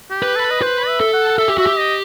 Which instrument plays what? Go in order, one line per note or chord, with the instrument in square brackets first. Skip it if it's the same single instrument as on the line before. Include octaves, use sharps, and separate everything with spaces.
[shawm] G4
[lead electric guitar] B4
[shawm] A4
D#5
[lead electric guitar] B4 [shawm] C5
[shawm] E5
[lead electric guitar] A4
[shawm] F#5
[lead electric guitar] A4 [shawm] E5
[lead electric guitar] G4
[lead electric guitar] F#4 [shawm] E5
[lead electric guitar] G4
[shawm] D#5